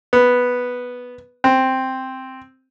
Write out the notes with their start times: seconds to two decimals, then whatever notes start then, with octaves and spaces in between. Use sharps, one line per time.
0.13 B3
1.44 C4